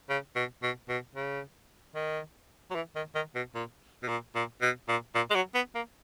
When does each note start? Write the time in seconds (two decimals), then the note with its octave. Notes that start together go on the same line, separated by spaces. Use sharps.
0.09 C#3
0.36 B2
0.62 B2
0.89 B2
1.15 C#3
1.95 D#3
2.70 F#3
2.75 E3
2.96 D#3
3.15 D#3
3.35 B2
3.55 A#2
4.03 B2
4.08 A#2
4.35 A#2
4.62 B2
4.88 A#2
5.15 A#2
5.30 G#3
5.35 F#3
5.54 B3
5.75 A#3